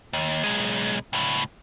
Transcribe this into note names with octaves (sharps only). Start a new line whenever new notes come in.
D#2
B1 G#3
C#2 A2